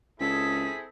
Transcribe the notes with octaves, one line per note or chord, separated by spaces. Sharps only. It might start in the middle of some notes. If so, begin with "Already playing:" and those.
C#2 C4 E4 G#4 A4 B6